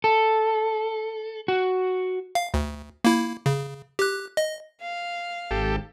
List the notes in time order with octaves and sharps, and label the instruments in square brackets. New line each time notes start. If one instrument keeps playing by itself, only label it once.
[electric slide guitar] A4
F#4
[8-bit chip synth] F5
D2
A#3 E4
C#3
G4 F#6
D#5
[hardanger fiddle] F5
[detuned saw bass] G#1 [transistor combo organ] G4 A4